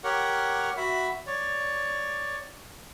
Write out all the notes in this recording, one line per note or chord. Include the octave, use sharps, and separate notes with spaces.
G4 A#4 C#5 F#5
F#4 E5 B5
C#5 D5